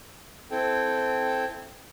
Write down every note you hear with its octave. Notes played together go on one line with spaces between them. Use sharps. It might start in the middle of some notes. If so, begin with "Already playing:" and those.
C4 E4 A4 G5